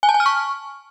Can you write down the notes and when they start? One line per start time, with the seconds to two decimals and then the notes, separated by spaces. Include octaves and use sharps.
0.03 G#5
0.09 A5
0.14 G#5
0.20 F6
0.26 C#6